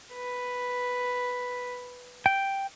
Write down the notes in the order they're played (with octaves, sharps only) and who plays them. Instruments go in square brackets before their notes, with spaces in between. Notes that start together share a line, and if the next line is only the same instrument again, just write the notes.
[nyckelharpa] B4
[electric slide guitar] G5